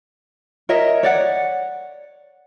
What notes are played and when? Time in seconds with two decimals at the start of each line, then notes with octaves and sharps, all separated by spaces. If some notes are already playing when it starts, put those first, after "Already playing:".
0.69 A#4 C#5 D#5 E5
1.03 C#5 D5 F#5